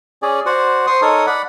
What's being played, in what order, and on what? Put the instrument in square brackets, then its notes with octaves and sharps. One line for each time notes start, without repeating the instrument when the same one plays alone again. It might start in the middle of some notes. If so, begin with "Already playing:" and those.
[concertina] C#4 G#4 D5
F#4 C5 D5 F#5
C5 C6 C#6 D#6
D#4 A4 A#4 C#5 D#6
D5 F#5 B5